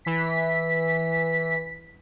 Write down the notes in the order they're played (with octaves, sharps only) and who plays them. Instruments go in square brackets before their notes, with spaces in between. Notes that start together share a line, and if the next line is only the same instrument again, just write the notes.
[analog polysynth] E3 B6